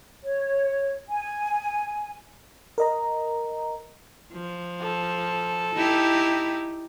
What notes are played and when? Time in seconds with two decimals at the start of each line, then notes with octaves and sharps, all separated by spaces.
0.23 C#5
1.08 G#5
2.78 A#4 D#5 A#5
4.32 F3
4.82 A4
5.75 D#4 E4 G4